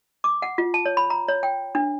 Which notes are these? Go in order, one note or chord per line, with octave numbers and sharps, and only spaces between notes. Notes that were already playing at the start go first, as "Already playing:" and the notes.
D6
F#5
F4
A5
C#5
B5
A#5
C#5
G5
D4